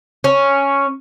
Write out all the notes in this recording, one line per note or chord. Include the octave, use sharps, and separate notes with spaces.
C#4